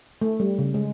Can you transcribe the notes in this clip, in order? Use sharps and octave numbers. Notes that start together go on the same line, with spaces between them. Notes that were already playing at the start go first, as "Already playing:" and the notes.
A3
G3
C#3
G#3